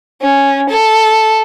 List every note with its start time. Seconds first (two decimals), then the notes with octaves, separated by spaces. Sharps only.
0.22 C#4
0.69 A4